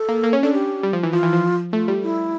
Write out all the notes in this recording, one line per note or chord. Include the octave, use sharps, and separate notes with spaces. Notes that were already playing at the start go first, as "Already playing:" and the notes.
Already playing: A4
A#3
A#3
C#4
D4 A4
G4
G3
F3
E3
F3 F4
E3
F3
A3 F4
G3
E4